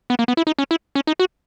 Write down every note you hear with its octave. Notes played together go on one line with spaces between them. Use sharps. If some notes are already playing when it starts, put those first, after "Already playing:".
B3
A#3
B3
E4
D#4
C#4
E4
C#4
D#4
F#4